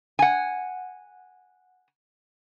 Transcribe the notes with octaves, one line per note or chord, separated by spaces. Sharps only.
F#5 G#5